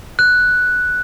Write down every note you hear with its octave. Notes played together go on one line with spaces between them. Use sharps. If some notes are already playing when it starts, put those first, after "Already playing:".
F#6